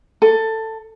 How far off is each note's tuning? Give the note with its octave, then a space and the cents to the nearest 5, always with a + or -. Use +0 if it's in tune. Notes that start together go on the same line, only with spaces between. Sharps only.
A4 +15